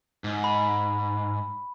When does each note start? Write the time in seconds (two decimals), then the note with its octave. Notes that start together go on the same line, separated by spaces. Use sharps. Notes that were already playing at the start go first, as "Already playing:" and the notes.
0.24 G#2
0.44 B5